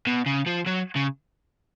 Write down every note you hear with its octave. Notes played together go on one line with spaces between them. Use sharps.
B2
C#3
F3
F#3
C#3